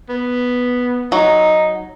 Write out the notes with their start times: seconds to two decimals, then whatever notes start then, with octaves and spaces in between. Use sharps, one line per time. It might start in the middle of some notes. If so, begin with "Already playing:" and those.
0.09 B3
1.12 F#3 D#4